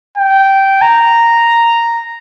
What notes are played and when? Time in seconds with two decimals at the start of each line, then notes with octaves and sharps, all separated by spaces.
0.18 G5
0.81 A#5